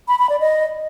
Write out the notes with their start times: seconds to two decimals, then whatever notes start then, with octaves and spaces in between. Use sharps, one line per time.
0.08 B5
0.19 B5
0.30 D5
0.40 D#5